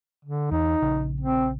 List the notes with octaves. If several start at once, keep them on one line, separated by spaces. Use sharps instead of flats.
D3
E2 D#4
A#1 C#3
C4